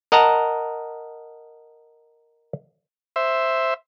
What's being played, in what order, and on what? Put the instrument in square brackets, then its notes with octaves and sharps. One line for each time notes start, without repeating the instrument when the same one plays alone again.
[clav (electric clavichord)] A#4 D#5 F#5 A5 A#5
[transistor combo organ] C5 E5